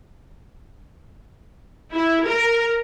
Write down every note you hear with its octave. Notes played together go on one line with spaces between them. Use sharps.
E4
A#4